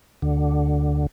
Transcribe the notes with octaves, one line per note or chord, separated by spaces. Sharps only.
D2 D3